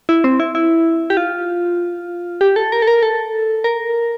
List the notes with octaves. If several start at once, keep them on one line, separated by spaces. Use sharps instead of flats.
E4
C4
E4
E4
G4
F4
G4
A4
A#4
A4
A#4
A4
A#4